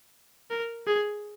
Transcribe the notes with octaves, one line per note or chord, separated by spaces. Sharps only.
A#4
G#4